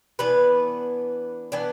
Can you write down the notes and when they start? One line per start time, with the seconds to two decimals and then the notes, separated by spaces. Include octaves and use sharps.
0.19 E3 B3 D4 B4
1.52 E3 B3 D4